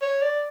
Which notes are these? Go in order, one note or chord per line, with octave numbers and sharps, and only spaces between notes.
C#5
D5